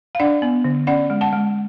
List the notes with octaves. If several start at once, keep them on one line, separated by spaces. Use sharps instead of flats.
F5
D4 D5 F#5
B3
D3
C#4 D5 F#5
G#3
F#5 A5
G#3